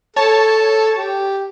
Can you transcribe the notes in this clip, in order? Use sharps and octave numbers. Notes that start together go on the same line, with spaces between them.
A4 C#5 A5
G4